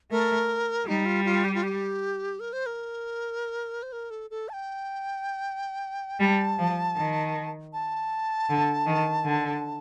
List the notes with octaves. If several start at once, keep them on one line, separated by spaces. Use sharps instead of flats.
A3 A#4
G3 D#4
F4
F4
G4
F4
G4
A#4
C5
A#4
C5
A#4
A4
A4
A5
G5
G3 A5
F3
D#3
A5
D3
D#3
D3